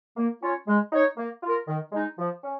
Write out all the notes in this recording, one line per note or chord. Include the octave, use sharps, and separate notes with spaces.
A#3
C#4 F4 C#5
G#3
D#4 C#5
A#3
F4 A#4
D#3
G#3 D#4
F3
C#4